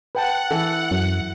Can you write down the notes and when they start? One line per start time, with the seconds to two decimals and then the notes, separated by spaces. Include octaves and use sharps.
0.15 B4 F#5 G5 A5
0.51 E3 A4
0.91 F#2